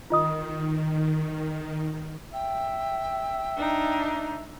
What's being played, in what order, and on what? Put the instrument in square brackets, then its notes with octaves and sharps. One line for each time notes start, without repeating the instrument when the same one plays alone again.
[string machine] D#3 [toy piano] F4 D#5 D#6
[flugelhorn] E5 [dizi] G5
[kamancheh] D4 D#4